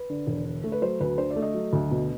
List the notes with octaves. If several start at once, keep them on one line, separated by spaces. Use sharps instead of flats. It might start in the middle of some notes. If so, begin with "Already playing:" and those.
Already playing: B4
D3
E1
D3
A3
B4
F#3 C5
D2 B4
D3 C5
D5
A3
D#5
F#3
D2
B2